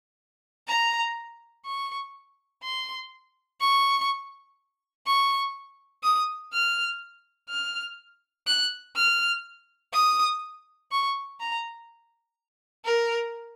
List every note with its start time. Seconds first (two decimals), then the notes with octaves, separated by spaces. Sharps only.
0.68 A#5
1.65 C#6
2.63 C6
3.61 C#6
5.07 C#6
6.04 D#6
6.53 F6
7.50 F6
8.47 F#6
8.96 F6
9.93 D#6
10.92 C#6
11.40 A#5
12.85 A#4